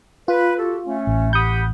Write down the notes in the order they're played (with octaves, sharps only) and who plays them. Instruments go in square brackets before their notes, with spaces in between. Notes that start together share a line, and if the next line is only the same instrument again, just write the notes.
[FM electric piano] F4 [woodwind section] B4
[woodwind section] F#4 G4 A4
A3 C#4
[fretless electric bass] A1
[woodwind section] G4 F#5 B5 [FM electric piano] D#6 G6